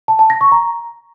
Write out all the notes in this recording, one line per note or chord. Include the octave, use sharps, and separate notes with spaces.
A5
A5
A#6
C#6
A#5